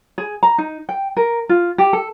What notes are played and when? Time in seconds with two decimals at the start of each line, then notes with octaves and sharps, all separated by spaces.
0.18 G#4
0.43 A#5
0.58 D#4
0.89 G5
1.17 A#4
1.49 F4
1.78 G4
1.93 A4